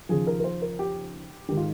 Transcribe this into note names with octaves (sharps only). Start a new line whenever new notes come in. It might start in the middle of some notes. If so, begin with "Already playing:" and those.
D#2 C#3 F3 G#4
A#4
A#4
C5
A#4
G4
G#1 D#3 G#3 G4
F4